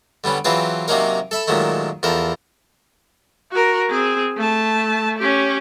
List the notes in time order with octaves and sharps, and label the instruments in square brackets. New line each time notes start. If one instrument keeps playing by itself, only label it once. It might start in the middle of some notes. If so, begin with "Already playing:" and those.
[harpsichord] D3 G3 B3 C#4
E3 F#3 C4 F4 G#4 B4
C3 F#3 A#3 C#4 D#4 A#4
A4 E5 B5
A#2 D#3 F#3 G#3 A3
E2 F3 A4 A#4
[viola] F#4 A#4
C4 G#4
A3 A5
C#4 G4